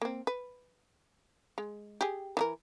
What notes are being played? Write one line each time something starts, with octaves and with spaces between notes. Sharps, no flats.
A#3 C4
B4
G#3
G4 G#4
E3 D#4 A#4